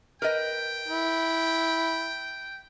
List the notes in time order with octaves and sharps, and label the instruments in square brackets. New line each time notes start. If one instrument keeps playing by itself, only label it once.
[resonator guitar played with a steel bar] A#4 B4 D#5 [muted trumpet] G5
[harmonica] E4